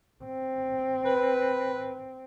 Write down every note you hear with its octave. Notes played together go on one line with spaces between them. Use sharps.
C4
B4